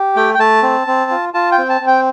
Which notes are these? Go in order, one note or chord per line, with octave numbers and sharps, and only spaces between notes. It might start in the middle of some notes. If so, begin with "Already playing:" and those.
Already playing: G4
A3 G5
G5
A3 A5
C4
C4
F4
F4 A5
G5
C4
A5
C4
G5